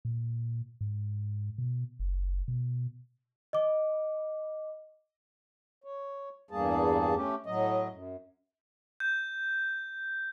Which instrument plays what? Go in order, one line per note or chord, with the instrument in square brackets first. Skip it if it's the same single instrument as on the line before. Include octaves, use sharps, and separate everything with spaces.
[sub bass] A#2
G#2
B2
F#1
B2
[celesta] D#5 D6
[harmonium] C#5
E2 G2 G3 A#3 G#4 A5
A3 C#4 G4
A2 F#3 D#5
F#2
[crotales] G6